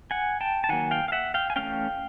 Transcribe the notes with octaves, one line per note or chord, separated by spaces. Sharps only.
F#5 G#5
G5 A5
A5
D#3 F#3 A#3 F#5 G#5
F5 G5
F5
E5 F#5
F5 G5
G#5
E3 A3 C#4 F5 G5